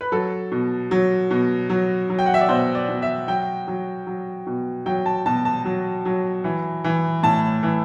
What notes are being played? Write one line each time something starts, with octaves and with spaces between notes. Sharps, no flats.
B4
F#3 A4
B2
F#3
B2
F#3
F#3
G5
F#5
E5
D5
B2 C5
D5
B2
E5
F#3 G5
F#3
F#3
B2
F#3 G5
A5
B2 A5
A5
F#3
F#3
E3
E3
A2 A5
E3